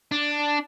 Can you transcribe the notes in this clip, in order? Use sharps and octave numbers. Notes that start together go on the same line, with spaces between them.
D4